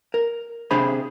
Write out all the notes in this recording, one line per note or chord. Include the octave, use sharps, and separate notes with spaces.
A#4
C3 D4 G#4 C5 B5